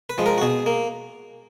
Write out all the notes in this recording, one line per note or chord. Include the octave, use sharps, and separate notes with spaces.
B4
F3 G#3
A#4
F#4
B2 G#4
A#3